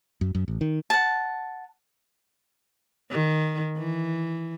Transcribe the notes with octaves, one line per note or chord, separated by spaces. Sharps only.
F#2
F#2
A1
D#3
F#5 A5
D#3
E3